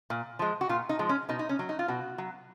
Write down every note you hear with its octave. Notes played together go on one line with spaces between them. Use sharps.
A#2
F3 G#3
F#4
A#2 F4
D#4
F3 G#3
C#4
B2 D#4
D#4
C#4
F#3
D#4
F4
B2 F#4
F#3